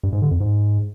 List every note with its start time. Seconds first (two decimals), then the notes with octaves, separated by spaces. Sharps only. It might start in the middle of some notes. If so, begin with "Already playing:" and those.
0.03 G2
0.13 G#2
0.22 D3
0.31 F2
0.40 G#2